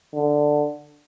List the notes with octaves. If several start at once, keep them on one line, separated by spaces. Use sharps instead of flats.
D3